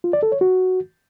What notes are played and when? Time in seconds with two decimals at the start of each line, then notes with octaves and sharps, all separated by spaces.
0.04 F4
0.13 D5
0.23 A4
0.32 C#5
0.41 F#4